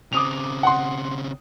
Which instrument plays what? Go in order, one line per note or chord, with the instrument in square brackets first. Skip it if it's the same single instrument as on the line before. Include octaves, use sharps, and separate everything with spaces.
[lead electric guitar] C#3 C4 [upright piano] D6 D#6 F7
[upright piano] F#5 C6